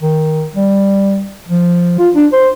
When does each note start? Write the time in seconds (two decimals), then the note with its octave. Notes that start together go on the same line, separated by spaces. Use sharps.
0.02 D#3
0.55 G3
1.49 F3
1.98 F4
2.15 D4
2.33 C5